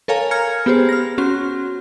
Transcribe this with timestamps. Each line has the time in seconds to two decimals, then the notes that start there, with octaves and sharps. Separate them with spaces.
0.08 A4 A#4 C#5 F5 G#5 A#5
0.31 A#5 F6 G#6 C#7
0.66 B3 G4 G#4 C5
0.89 F6 A#6
1.18 C#4 F#4 C6